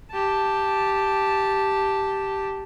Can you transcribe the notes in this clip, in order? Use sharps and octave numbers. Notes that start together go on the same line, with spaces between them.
G4 A5